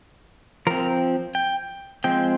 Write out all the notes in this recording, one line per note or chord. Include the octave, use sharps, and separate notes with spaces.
F3 C4 A#4
G5
F3 G#3 C4 G5